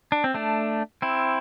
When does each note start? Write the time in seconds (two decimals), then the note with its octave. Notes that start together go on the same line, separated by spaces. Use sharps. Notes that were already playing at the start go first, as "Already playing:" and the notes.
0.12 D4
0.24 C4
0.34 A3 D4
1.02 C4 E4